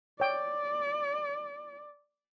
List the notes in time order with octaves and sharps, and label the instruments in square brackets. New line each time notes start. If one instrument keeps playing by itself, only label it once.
[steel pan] C#5 G5 [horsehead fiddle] D5